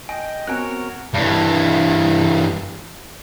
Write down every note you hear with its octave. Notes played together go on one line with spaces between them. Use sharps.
D#5 G5 G#5
B3 C4 F#4 A#4 C#5 G#5 F#6
G2 E3